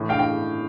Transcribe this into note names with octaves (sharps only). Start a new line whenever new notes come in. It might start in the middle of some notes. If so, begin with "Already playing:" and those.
Already playing: A2 E3
F5 G5
G5